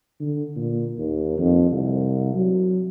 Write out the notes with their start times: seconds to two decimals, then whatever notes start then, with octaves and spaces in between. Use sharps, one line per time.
0.20 D3
0.56 A#2
0.98 D#2
1.38 F2
1.71 C2
2.34 F#3